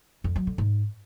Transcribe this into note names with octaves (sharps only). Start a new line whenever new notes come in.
F2
F#3
D3
G#2